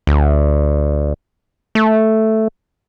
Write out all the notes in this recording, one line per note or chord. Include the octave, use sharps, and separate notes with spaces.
D2
A3